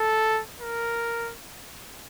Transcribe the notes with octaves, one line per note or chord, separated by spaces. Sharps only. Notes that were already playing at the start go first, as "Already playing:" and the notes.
Already playing: A4
A#4